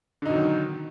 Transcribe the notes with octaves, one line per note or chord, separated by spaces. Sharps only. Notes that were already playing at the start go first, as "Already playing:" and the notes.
B2 D3 D#3 F#3 D#4